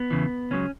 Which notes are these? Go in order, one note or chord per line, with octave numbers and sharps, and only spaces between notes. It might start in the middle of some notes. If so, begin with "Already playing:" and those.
Already playing: B3
E2 C#3 E3
C#2 C#3 F#3 C#4